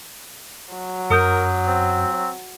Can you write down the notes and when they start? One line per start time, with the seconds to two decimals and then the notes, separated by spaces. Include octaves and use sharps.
0.73 F#3
1.10 F#2 A#4 D#6 G6
1.67 C4